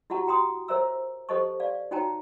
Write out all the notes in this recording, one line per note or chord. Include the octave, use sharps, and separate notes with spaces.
E4 F#4 G4 F#5 A5 A#5
F#4 G5 A#5 C6 D#6
A#4 C5 C#5 E5 A#5 E6
G4 A4 C5 D#5 A5 C#6
D5 F5
D#4 F#4 C#5 G5 A5 A#5